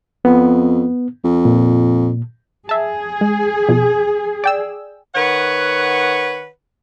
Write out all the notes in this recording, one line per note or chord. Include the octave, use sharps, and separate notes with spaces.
F2 B3
F2
A#2
G#4 E5 A5
G#3
F2 B2
D5 G5 E6
D#3 B4 C#5 F#5